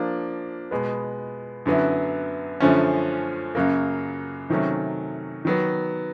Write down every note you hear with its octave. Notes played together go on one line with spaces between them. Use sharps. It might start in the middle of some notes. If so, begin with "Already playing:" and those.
Already playing: F3 A#3 D4
B2 G#3 B3
F#2 D3 F#3 B3 E4
F#2 D3 F3 A3 C#4
F#2 C#3 F#3 A#3
C3 D#3 F#3 A3 C#4
D#3 F#3 B3